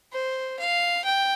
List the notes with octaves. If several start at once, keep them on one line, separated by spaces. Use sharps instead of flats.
C5
F5
G5